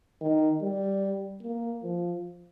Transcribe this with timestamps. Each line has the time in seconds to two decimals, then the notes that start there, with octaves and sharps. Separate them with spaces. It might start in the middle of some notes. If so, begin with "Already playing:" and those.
0.21 D#3
0.62 G3
1.43 A#3
1.84 F3